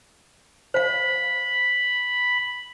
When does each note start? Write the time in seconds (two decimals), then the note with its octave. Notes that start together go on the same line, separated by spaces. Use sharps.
0.74 C5 F5 B5